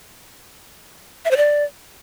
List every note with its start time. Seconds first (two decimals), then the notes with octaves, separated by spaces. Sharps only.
1.25 E5
1.31 C5
1.37 D5